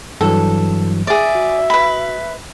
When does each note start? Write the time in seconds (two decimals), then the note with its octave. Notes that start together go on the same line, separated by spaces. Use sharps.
0.21 G2 E3 F#3 A4
1.07 G#4 D5 E5
1.35 F#4
1.70 B4 B5